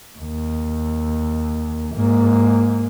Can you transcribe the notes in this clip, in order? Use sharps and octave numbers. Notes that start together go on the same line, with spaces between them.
D#2
G#2 A#3